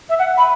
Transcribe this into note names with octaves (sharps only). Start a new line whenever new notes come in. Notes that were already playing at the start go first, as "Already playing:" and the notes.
E5
F#5
B5